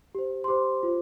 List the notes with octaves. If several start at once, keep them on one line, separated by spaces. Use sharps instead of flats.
G4 C5
C6
G4 C5 D6
F4 C5